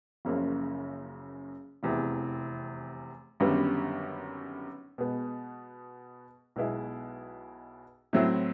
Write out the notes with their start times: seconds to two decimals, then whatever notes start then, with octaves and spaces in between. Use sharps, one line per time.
0.25 F#1 F#2 C#3 F3 A#3
1.83 F1 E2 C3 E3
3.40 G#1 F#2 D3 G3 B3
4.98 B2 G#3 B3
6.56 B1 B2 G#3 B3 E4
8.13 A2 F#3 A3 C4 E4